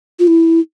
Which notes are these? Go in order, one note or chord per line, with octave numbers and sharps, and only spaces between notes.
F4
E4